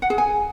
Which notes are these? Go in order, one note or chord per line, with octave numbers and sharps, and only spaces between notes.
F#5
G#4
G#5